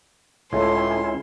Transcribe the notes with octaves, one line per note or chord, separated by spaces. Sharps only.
C#2 A2 C#4 E4 C6